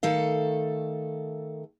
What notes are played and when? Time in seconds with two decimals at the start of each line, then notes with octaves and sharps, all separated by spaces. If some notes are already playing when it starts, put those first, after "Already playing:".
0.03 D#3 A3 A4 F5